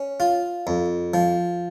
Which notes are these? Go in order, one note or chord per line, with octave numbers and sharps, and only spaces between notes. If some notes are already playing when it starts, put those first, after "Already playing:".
Already playing: C#4
F4
F2
F3